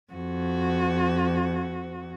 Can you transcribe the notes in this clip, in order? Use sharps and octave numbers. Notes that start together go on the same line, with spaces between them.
F2 F#4